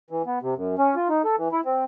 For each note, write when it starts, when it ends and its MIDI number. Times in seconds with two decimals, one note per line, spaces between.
0.11 0.22 52
0.27 0.39 59
0.42 0.54 48
0.56 0.75 42
0.79 0.95 61
0.96 1.08 65
1.09 1.22 63
1.24 1.36 69
1.38 1.48 52
1.52 1.61 64
1.65 1.84 60